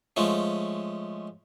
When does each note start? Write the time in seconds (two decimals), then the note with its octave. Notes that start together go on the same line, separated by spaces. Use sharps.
0.16 F3 G#3 A3 C#4